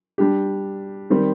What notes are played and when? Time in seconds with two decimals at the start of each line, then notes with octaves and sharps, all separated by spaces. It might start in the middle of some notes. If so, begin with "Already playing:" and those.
0.18 G3 D4 G4
1.10 D#3 G3 C4 G4